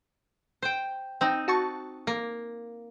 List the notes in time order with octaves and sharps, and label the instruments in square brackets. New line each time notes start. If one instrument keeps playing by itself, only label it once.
[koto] C5 G5
C4 D#4
[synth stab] F#4 A5 C#6
[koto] A#3